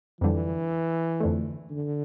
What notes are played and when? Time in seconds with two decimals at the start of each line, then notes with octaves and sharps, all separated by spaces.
0.21 F2 D3 E3 G3
1.20 F2 D3 A3
1.70 D3